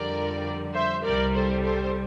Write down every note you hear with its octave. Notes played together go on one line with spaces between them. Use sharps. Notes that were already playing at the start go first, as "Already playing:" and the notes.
Already playing: F2 D3 G3 A#4 D5
C5 E5
C2 C3 G3 A#4 D5
A4 C5
A4 C5